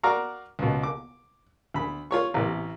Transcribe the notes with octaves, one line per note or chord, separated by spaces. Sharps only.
F#4 A#4 D5 F5 A#5 C#6
C#2 B2
D6
D2 B5
F4 C#5 C#6
A1 C3